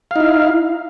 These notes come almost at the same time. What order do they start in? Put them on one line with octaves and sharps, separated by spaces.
F5 D#4 E4